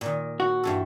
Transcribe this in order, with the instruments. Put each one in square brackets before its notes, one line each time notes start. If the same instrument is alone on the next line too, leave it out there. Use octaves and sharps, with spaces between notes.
[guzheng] A#2 D#3
[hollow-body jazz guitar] F#4
[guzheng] G2 E3 A4